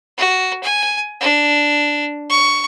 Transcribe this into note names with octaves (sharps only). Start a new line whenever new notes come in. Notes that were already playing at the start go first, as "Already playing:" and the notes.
F#4
G#5
D4
C#6